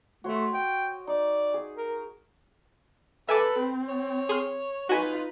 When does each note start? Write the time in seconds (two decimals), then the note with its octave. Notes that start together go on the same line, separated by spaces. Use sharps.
0.24 A3 F#4 C#5 C6
0.54 D#5 G5
1.07 D#4 D5
1.54 G#4
1.77 A#4
3.29 A4 B4 E5 G#5 D6
3.59 C4
3.88 C#5
4.29 G#4 C6 F6
4.89 D#4 F4 F#4 B4 G#5